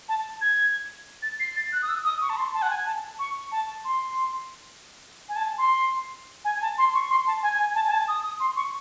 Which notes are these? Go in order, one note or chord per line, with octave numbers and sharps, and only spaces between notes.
A5
G#6
A6
C7
A6
F#6
D#6
E6
D#6
C#6
A5
C6
A5
F#5
G#5
A5
C#6
A5
C6
G#5
A5
C6
G#5
A5
C6
C#6
C6
A5
G#5
G#5
A5
G#5
A5
D#6
D#6
C6
C#6